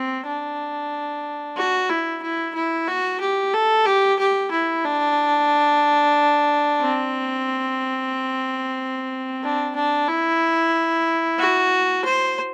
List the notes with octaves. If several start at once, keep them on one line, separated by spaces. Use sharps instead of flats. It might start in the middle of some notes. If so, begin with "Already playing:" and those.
Already playing: C4
D4
F#4
E4
E4
E4
F#4
G4
A4
G4
G4
E4
D4
C4
D4
D4
E4
F#4
C5